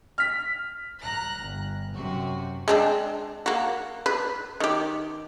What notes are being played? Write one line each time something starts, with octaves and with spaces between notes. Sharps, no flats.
F6 B6
A#5 F#6 A#6
G1
F#2 C3 F#4
G#3 C4 D4
A#3 F#4
B4
D#3 G4